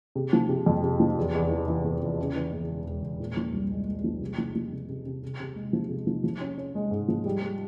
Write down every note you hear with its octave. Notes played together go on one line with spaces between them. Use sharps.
C3
F3
C3
F2
C3
F3
E2
E2
E3
E3
E2
E2
C#3
E3
E2
E1
E1
E1
A#2
F3
C2
G#3
G#3
F3
C3
F3
F3
C3
C3
C3
C3
C3
G#3
F3
C3
F3
F3
C#4
C#4
G#3
G#2
F3
G3
G3